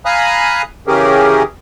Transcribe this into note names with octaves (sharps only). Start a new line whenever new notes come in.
F5 G#5 A#5 B5 D#6 F#6
C#3 E3 C#4 G4 G#4 A#4